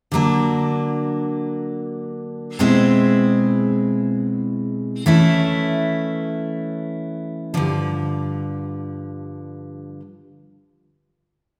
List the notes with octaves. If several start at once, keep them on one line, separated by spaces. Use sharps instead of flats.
D3 F#3 A#3 D4
B2 G#3 C4 E4 G#4
E3 A3 C#4 E4
G2 D3 F3